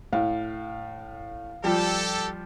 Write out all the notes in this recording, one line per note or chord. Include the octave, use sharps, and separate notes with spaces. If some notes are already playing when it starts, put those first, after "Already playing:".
A2 F5
F3 G3 G4 A4